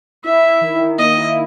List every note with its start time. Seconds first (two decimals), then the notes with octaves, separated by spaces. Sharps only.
0.24 E4 E5
0.43 E4
0.61 D#3
0.80 D#3
0.98 A#3 D#5
1.17 E4